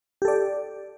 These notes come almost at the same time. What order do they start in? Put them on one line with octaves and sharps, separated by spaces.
G4 A4 D5